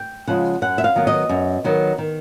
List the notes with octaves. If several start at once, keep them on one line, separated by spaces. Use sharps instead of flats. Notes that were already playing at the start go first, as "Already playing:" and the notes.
Already playing: G5
C#3 F3 G#3 F#5
F#2 F#5
E5
F5
D#3 F#3 B3
D#5
F#2
D#3 F#3 B3
D#3